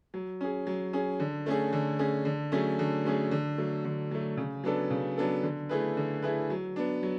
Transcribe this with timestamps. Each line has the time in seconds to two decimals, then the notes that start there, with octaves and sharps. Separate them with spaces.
0.14 F#3
0.41 C#4 G#4
0.67 F#3
0.93 C#4 G#4
1.20 D3
1.46 A3 C#4 G#4
1.73 D3
1.99 A3 C#4 G#4
2.25 D3
2.52 F#3 A3 C#4 G#4
2.79 D3
3.05 F#3 A3 C#4 G#4
3.31 D3
3.58 F#3 A3
3.85 D3
4.11 F#3 A3
4.37 C#3
4.64 F#3 B3 D4 A4
4.90 C#3
5.18 F#3 B3 D4 A4
5.43 D3
5.69 A3 E4 G#4 B4
5.97 D3
6.22 A3 E4 G#4 B4
6.50 F#3
6.76 B3 D4
7.03 F#3